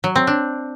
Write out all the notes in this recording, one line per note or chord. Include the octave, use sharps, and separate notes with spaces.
F#3
C4
D4